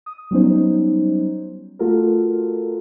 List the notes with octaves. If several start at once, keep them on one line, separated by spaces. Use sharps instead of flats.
D#6
F#3 G3 B3 C#4 D#4 C5
A3 F4 F#4 A4 A#4